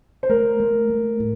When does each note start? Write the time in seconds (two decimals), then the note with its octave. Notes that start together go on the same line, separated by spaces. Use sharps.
0.23 C5
0.29 A3 A#4
0.60 A3
0.90 A3
1.20 A2